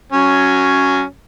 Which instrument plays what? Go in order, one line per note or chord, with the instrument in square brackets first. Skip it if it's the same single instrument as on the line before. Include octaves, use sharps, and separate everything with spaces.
[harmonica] F#3 C#4